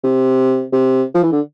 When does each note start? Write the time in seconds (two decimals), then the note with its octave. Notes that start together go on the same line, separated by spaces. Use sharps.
0.03 C3
0.72 C3
1.14 F3
1.23 E3
1.32 D3